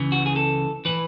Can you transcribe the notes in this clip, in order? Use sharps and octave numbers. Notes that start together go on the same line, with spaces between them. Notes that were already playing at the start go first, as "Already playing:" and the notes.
Already playing: C#2 C#3 E3
F#4
G#4
A4
A2 E3 B4